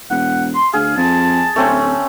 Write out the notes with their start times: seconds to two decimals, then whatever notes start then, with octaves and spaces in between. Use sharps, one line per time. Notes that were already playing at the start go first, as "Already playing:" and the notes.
0.10 E1 F#5
0.55 C6
0.73 D2 G#4 F5
0.97 F2 A5
1.56 D1 A3 C4 C#4